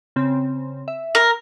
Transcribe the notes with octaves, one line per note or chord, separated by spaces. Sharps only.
C#3 C4
E5
A#4